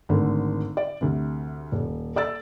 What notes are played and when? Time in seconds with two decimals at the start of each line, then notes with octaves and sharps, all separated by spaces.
0.09 G#1 D3 A3
0.77 D5
1.01 D2 C3
1.72 D#1
2.16 A4 D5 E6 A6